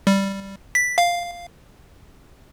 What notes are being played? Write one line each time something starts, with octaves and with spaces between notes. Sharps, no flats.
G3
B6
F5